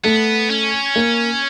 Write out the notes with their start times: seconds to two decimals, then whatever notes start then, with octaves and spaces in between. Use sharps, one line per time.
0.04 A3 B3
0.50 C#4
0.96 A#3